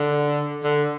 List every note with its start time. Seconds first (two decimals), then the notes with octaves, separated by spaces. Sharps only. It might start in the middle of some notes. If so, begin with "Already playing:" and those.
Already playing: D3
0.64 D3